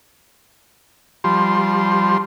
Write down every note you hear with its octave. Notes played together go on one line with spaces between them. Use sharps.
F3 G3 C6